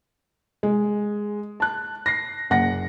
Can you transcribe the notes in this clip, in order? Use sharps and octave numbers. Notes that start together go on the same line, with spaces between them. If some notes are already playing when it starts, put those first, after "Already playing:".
G#3
A5 F#6
A#6 C7
F#1 F#5 A#6